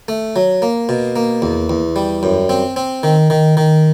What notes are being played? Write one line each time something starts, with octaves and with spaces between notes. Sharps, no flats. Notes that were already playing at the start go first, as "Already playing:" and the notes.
A3
F#3
A#3
B2
A#3
E2
E2
G3
F#2
C4
C4
D#3
D#3
D#3